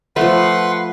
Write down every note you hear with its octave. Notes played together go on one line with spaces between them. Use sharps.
F3 A3 B4 F#5 C6